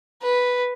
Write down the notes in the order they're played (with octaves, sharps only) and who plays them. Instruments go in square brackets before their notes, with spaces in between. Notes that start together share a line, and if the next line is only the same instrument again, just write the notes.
[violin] B4